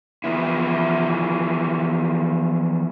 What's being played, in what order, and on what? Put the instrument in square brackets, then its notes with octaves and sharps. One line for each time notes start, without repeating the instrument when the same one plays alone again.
[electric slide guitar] E3 F3 B3 E4